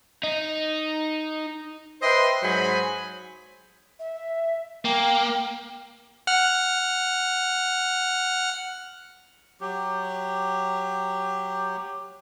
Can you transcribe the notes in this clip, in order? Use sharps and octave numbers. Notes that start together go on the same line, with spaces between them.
D#4
B4 C5 D#5 E5 G5 C6
G#2 F#3 G#4 C5 G#5 B5
E5
A#3 G5
F#5 F6
F#3 G4